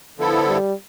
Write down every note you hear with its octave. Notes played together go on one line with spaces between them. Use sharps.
D3 F3 B3 E4 A4
G3